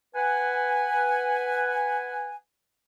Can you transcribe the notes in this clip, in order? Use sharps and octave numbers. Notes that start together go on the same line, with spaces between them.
B4 F#5 G#5